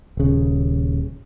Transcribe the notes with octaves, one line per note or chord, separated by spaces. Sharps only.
D#1 C#3